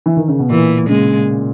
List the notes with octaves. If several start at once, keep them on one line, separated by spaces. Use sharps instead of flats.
E3
D#3
C#3
B2
A#2 E3
C#3 G#3